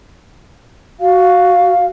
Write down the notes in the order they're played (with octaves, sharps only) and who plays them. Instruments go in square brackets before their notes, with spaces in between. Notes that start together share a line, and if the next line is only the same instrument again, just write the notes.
[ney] F#4 [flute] F5